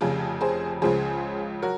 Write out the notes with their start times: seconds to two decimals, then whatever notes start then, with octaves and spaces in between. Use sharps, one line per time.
0.01 F1 F2 C#3 F4 G#4
0.41 G#4 C5
0.82 C#2 C#3 F3 G#4 C5
1.62 F#3 F#4 A#4